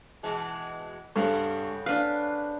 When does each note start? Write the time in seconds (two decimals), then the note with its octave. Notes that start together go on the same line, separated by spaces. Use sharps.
0.23 B2 E3 G#3
1.16 G2 C#3 B3 C4 A4
1.86 D4 B4 F5